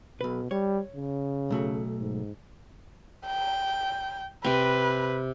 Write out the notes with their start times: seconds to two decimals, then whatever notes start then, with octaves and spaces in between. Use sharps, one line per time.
0.21 B1 B2 B4
0.51 G3 C#5
0.96 C#3
1.50 B1 A3 F#4
1.99 G#2
3.26 G5
4.44 C3 C4 B4